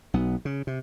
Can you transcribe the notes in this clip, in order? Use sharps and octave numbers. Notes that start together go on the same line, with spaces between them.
B1 B3
C#3
C3